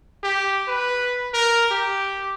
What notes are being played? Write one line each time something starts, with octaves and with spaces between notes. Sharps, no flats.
G4
B4
A#4
G4